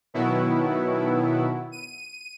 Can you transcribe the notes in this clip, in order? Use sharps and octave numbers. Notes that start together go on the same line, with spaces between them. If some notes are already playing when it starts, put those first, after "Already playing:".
B2 D#3 F#3 B3 E4
D#7